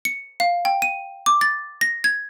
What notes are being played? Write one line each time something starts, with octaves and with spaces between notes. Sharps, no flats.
C#7
F5
G5
D#7
D6
A6
A#6
G#6